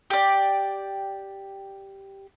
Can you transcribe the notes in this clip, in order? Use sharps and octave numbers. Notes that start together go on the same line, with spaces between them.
G4 D5